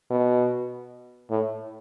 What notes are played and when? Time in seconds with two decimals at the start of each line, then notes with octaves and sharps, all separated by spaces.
0.10 B2
1.30 A2